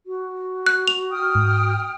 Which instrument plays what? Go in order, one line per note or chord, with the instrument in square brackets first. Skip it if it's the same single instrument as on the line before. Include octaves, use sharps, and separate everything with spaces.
[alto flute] F#4
[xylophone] F#6
F7
[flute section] G5 D#6 F6
[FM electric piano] G#2